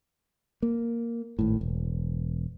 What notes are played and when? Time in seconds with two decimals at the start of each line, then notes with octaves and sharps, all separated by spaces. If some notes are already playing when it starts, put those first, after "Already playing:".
0.63 A#3
1.39 G#1 A2
1.61 E1